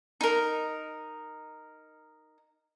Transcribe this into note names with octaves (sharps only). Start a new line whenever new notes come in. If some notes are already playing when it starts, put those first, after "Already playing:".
D#4 A#4